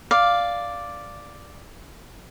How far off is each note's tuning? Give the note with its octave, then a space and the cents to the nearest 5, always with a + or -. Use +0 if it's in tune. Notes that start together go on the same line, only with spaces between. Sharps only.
D5 +0 F5 +0 D6 +0